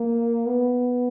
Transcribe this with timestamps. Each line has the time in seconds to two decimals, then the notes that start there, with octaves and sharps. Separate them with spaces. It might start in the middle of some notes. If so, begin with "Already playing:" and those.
Already playing: A#3
0.47 B3